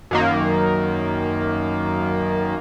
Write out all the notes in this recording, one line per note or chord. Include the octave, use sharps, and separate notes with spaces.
F#2 D#3 A#3